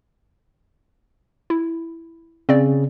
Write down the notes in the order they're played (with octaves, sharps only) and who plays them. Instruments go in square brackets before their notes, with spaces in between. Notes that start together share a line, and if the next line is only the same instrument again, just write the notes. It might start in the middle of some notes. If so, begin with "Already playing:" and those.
[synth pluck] E4
[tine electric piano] C#3 [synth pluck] C4 D5